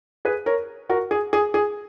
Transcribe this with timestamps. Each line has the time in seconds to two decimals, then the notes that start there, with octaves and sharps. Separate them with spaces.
0.25 G#4 B4
0.46 A#4 C#5
0.89 F#4 A#4
1.11 G#4
1.33 G#4
1.54 G#4